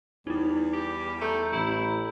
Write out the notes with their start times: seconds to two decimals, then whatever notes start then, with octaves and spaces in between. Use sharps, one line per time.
0.27 E2 G3 D#4 E4
0.73 G4
1.21 A3 A#5 G6
1.53 A1 E4